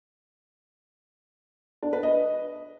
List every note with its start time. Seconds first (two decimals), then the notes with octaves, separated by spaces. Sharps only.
1.83 D4
1.93 B4
2.03 D#5